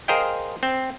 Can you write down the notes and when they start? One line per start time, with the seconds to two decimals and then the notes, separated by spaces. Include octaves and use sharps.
0.08 G#4 A#4 C5 D#5 F5 G5
0.63 C4